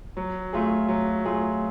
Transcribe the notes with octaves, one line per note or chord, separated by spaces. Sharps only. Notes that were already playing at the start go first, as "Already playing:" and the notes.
F#3
A3 F4 G#4
F#3
A3 F4 G#4